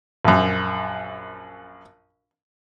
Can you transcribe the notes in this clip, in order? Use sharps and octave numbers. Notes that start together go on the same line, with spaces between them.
A#1 F#2